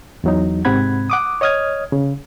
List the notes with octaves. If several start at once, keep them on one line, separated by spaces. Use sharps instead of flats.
E2 F#3 D#4
G#2 C3 C4 F#5 B5 G#6
F#5 D6 D#6
C#5 D#5 D#6 F6 G#6
C#3